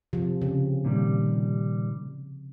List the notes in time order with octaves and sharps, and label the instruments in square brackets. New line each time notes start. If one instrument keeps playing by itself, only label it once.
[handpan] C3 F3
C#3
[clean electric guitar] A#2 D#3 G3